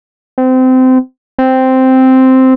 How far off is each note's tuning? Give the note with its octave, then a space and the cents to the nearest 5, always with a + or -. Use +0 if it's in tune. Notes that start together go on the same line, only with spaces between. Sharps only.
C4 -25
C4 -5